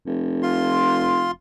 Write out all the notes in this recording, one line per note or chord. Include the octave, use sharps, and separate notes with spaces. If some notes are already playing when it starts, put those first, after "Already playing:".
F1
F4 C6